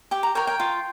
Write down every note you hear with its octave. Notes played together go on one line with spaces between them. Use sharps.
G4 G5
A#5
A#4 C#5 G5
G5
F4